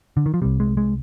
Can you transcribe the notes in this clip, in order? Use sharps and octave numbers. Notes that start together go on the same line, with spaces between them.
D3
D#3
F3
C2 C3 G3
G#3
G#3